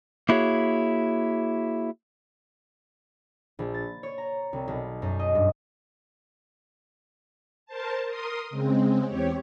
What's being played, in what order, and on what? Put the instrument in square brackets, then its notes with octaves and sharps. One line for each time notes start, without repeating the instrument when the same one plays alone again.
[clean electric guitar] A#3 E4 F#4 G#4 C#5
[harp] A#1
A6
C#5
A#5
C2
B1
F#2
D#5
G2
[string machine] A#4 C5 A5
A#4 C6 D#6
C#3 G#3 C4
E2 C4 G4 C#5